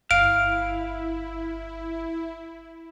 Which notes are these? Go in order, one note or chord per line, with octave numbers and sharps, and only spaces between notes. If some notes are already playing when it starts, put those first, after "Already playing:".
G1 E4 F5 D7